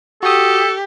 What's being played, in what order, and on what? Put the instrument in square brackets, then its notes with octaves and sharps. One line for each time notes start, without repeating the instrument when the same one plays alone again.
[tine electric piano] F#4 D#6 [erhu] G4 [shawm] A4